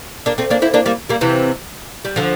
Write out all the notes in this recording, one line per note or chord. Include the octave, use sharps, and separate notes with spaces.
A#3 D4
A3 C4
A#3 D4
C4 E4
A#3 D4
G3 A#3
G3 A#3
C3 E3
G3
D3 F3